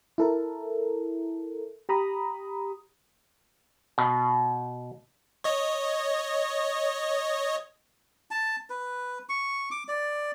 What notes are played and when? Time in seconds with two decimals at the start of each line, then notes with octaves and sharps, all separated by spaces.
0.18 E4 A4 A#4
1.89 G4 A#5 B5 D#6
3.98 B2
5.44 C#5 D#5
8.31 A5
8.70 B4
9.29 C#6
9.71 D6
9.88 D5